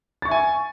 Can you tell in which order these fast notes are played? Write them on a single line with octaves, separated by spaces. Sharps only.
A6 C#6 E5 G#5